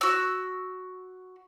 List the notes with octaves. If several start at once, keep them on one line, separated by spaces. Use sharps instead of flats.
F#4 E6